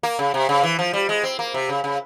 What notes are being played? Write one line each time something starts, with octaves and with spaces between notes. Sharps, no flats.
A#3
C#3
C3
C#3
E3
F3
G3
G#3
C4
A#3
C3
C#3
C#3